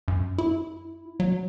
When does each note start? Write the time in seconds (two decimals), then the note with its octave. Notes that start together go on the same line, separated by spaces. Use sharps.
0.08 F#2
0.38 E4
1.20 F#3